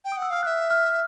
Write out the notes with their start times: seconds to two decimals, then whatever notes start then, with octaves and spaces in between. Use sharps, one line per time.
0.05 G5
0.12 D#6
0.17 F#5
0.22 E6
0.30 F5 F6
0.43 E5 F5 F#6
0.71 F6